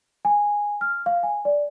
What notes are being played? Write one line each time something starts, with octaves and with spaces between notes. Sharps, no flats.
G#5
F6
F5
G#5
D5